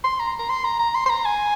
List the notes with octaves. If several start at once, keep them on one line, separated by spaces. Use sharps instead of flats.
C6
A#5
A#5
C6
A#5
A#5
C6
C6
A#5
G#5